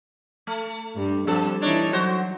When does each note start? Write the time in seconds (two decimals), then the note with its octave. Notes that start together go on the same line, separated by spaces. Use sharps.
0.47 A3
0.95 G2 G3
1.27 F3 G3 C4 A4
1.62 E3 D4 D#4 C#5
1.93 F#3 F#4 C5